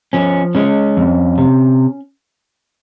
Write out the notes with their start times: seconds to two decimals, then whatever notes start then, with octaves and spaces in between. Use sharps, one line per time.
0.13 F3 C#4
0.55 G#3 C#4
0.97 F2
1.38 C3